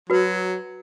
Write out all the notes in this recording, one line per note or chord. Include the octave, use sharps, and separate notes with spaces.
F#3 F#4 B4